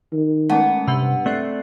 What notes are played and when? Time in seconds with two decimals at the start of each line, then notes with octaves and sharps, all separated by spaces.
0.13 D#3
0.50 G#3 A3 B3 C#4
0.87 G2 C3 F#5 B5 E6
1.26 A3 C4 D5 F#6 A6 C7